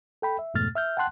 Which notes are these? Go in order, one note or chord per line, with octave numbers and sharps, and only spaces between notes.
A4 G5 B5
E5
F2 G#2 B2 A3 F6 A6
E5 F6 G6
F#5 G5 A5 C6 F#6